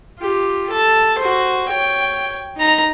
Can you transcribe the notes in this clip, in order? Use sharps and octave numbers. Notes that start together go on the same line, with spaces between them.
F4 G4
A4 A5
F#4 C5
C#5 G5
D#4 A#5